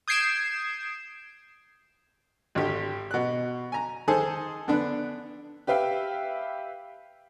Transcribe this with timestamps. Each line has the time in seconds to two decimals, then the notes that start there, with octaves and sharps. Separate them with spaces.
0.08 D#6 G6 G#6 C7 D7 E7
2.55 G#1 D3 G4
3.11 B2 F#6
3.72 G#5 A#5
4.08 D#3 G#4 A4 C5 A5
4.68 D3 B3 D4
5.67 G4 B4 E5 F5 G5